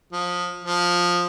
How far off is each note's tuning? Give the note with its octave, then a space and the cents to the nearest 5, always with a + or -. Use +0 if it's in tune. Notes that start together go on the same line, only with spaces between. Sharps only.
F3 +25
F3 +15